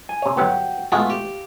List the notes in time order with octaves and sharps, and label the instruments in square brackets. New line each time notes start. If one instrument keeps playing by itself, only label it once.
[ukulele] G#5
[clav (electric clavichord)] C3 C#5
[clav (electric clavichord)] G1 F#3 B3 [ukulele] F#4 G4 F#5
[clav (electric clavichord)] G#3 F#4 [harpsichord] A3 B3 F4 [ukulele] F5
[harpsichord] G4